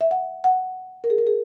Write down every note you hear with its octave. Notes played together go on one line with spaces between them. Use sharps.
E5
F#5
F#5
A#4
G#4
A#4
G#4